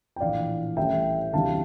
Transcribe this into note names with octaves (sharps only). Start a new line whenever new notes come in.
G5
A#1 A2 E3 D5 F5
A1 A2 G3 E5 G5
D2 C3 E3 G3 F5 A5